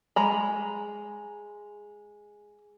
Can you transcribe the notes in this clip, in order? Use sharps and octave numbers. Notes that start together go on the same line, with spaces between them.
G#3 A#5 B5